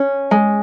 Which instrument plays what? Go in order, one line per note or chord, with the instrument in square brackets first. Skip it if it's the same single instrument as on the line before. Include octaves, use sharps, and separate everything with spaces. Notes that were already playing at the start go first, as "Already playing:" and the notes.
Already playing: [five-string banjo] C#4
G#3